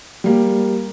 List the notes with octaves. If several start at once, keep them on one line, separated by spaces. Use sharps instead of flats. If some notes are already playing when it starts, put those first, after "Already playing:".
G3 A#3 G4